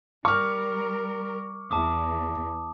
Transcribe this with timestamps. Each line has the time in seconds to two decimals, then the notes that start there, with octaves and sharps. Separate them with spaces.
0.25 G3 A#4 C#6 D6 F6
1.71 E2 A5 D6 D#6